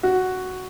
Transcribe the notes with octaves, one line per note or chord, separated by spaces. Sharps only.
F#4